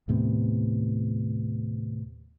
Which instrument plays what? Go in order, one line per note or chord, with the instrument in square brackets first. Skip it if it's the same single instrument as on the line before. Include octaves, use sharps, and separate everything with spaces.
[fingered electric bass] D#2 A2 C3 B3